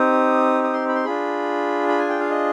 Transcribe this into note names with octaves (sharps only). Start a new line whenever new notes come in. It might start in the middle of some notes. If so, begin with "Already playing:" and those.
Already playing: C4 D#4 G4 D#6
D#6
C6
B5
C6
D4 F4 G#4 B5
B5
G#5
G5
F5
D#5